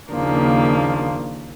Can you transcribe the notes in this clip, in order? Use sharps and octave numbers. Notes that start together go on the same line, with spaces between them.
D#2 C#3 F3 A#3 D4